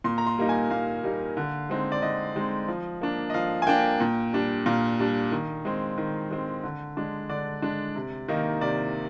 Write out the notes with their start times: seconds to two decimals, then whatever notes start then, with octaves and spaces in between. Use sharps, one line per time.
0.04 A#2 C6
0.18 A#5
0.27 C6
0.38 G3 A#3 D#4
0.49 G#5
0.70 A#2 F5
1.03 G3 A#3 D#4
1.37 D3
1.70 G#3 C4 D#4
1.92 D5
2.02 D3 D#5
2.35 G#3 C4 D#4
2.68 F3
3.01 A#3 D4
3.30 D#5
3.34 F3 F5
3.62 G#5
3.67 A#3 D4 G5
4.00 A#2
4.33 G3 D4
4.66 A#2 F5
4.99 G3 D4
5.32 D#3
5.65 G#3 C4
5.98 D#3
6.31 G#3 C4
6.64 D3
6.97 G#3 D4
7.30 D3 D5
7.62 G#3 D4
7.95 C3
8.28 D#3 A#3 D#4
8.61 C3 D5